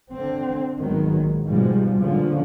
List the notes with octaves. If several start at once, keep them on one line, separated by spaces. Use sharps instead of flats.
D3 C4
G#1 D#3 F#3 G#3 B3
A#1
G#2 B2 F3 G3 G#3
A#2 D3 F3 C#4